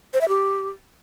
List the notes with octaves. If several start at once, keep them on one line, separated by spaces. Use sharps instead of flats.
C5
E5
G4